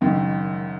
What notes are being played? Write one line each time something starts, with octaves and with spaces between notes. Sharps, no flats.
F#1 F#2 D#3